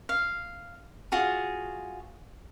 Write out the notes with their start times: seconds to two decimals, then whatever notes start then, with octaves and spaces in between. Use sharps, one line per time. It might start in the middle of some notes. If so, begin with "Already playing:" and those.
0.09 F5
1.12 F4 F#4 G#4